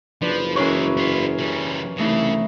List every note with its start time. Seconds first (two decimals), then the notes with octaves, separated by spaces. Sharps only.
0.22 F#1 F3 D4 B4
0.56 E3 G#3 C#4 D4 E4 F#4 A#4 C#5
0.97 B3 F4
1.39 C#3 G3
1.98 C2 C#3 E3 A3 D#4